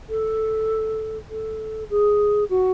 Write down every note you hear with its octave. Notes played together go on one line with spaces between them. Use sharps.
A4
A4
G#4
F#4